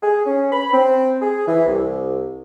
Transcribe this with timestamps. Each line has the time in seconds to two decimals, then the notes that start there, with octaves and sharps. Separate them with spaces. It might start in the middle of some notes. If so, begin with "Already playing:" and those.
0.03 G#4
0.25 C#4
0.51 B5
0.73 C4
1.21 G#4
1.48 E3
1.66 C2